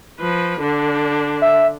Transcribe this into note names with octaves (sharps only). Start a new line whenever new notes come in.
F3 B4
D3 D4
E5